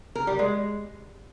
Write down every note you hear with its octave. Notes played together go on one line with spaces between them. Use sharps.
A#4
G3
G#3